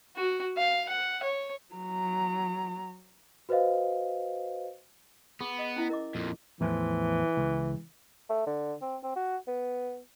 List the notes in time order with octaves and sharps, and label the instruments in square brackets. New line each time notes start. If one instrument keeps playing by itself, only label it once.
[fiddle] F#4
F5
F#5
C#5
[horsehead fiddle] F#3 A#5
[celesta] F#4 B4 C5 D#5 F5
[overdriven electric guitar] B3 [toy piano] G#4
[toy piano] D#5 D#6
C#4 E4 E5
A#4 D#5 D6
[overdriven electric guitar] F2 A#2
[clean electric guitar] E2 A2 F3 [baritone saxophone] E3
[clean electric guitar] C#2
[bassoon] A3
D3
C4
C4
F#4
B3